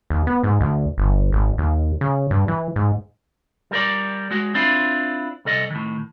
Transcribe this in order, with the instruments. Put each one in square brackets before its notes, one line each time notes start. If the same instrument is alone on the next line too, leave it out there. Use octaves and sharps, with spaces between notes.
[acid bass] D#2
B3
G#2
D2
G1
G#1
D#2
C#3
G2
E3
G#2
[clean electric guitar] G3 A#4 D5
G#3 F#4
C4 D4 E4 F4
C2 A4 D#5
A2 D#3